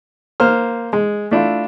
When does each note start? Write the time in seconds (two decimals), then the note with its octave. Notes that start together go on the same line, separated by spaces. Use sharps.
0.40 A#3 C5 F6
0.93 G#3
1.31 A3 D4 E4 F4